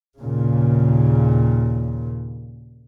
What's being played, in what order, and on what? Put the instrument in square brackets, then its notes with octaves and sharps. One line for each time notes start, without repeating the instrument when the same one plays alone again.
[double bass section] D#2 A#2 C#3